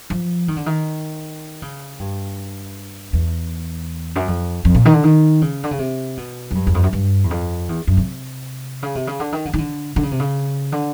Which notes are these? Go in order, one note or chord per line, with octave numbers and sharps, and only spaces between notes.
F3
D#3
D3
D#3
C#3
G2
E2
F#2
F2
F2
A#2
D#3
D3
D#3
C#3
D3
C#3
C3
B2
F#2
G2
E2
F2
F#2
G2
E2
F2
E2
F#2
C3
C#3
C3
C#3
D3
D#3
D3
D#3
D3
D3
C#3
C3
C#3
D3